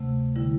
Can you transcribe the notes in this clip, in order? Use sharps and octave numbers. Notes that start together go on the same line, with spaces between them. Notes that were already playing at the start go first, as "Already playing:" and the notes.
Already playing: D2 C3 A3
D3 G3 E4